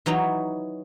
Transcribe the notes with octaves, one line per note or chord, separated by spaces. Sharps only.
E3 F#3 D#4 C#5